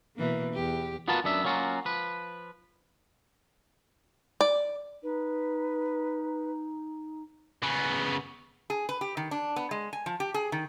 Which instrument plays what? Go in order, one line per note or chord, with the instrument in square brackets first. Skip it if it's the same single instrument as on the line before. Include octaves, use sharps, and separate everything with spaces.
[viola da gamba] B2 E3 A#3
E2 G4
[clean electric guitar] B3 F4 F#4 A#4 B4 A5
F#2 B3 D4 E5
F#3 A#3 C#4 F4 F#4
F3 B4
[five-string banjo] D5
[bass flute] D#4 [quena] B4
[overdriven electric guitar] C#3 B3
[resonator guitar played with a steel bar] G#4
B4
G4
D#3
D4
B3
G#3
G#5
F3
G4
G#4
D#3